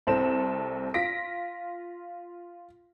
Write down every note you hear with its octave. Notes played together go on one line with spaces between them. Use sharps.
C2 C4 A4 E7
F4 A#6 B6 D7